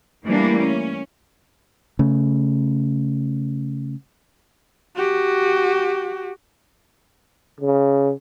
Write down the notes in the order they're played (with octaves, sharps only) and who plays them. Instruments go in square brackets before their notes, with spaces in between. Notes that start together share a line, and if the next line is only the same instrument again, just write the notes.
[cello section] E3 G3 A3 A#3 D4 E4
C#4
[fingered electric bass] C#3 A3
[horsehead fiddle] F#4 G4
[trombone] C#3